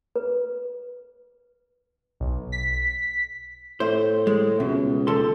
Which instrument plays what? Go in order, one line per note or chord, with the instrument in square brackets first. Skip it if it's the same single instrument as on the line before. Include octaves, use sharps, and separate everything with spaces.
[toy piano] B4
[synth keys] B1
B6
[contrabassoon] A2 [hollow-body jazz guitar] C5
[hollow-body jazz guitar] G#3
[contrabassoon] C#2 [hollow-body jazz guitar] B2
[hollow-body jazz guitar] D#2 A4 C6